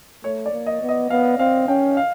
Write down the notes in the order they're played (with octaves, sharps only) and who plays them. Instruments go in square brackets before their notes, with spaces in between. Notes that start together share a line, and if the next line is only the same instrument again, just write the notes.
[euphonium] A3 [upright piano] C#5
[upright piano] D5
[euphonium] A#3
[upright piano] D#5
[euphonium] B3
[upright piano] D#5
[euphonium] B3 [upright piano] F5
[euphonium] C4 [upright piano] F5
[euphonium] C#4 [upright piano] G5
[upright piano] F5